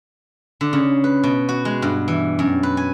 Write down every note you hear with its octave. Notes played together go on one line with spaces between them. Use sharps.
D3
C#3
B4
B2
F#4
G#3
G2
E3
F#2
B4
G#5